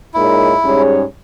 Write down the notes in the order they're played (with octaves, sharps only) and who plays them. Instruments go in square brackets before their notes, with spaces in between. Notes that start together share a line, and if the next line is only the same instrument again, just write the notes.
[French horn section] A#2 G#3 D#4 A#4 C#5 [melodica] E4
[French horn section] G#2 G3 C#4 G#4 C#5